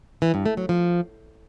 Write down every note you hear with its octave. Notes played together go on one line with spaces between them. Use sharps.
E3
G2
A3
F#3
F3